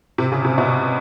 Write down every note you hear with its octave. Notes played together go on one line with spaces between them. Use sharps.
C3
C#3
C3
B2